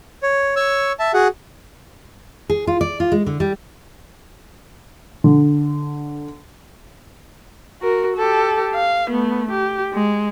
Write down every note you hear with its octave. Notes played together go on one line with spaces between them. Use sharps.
C#5
C#5 C#6 E6
E5 A5
F#4 G#4 F#5
G#4
F4
D5
F4
G#3
D3
G3
D3
F#4 A#4
G4 A4
F5
A3 B3
G4
G#3